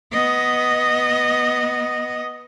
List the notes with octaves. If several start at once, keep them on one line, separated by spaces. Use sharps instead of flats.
B3 D#5